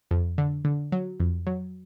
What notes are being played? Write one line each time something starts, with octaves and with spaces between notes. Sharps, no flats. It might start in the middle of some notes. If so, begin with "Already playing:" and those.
F2
D3
D3
F#3
F2
F#3